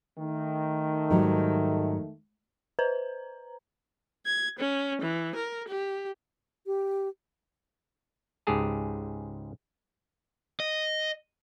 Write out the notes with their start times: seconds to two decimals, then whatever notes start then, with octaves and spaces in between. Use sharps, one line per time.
0.18 D#3 A3
1.10 G#2 F#3 G3
2.79 B4 C5 A#5
4.26 G#6
4.59 C#4
5.01 E3
5.35 A#4
5.67 G4
6.66 G4
8.47 C#2 G#2 G4 G#4 A5
10.60 D#5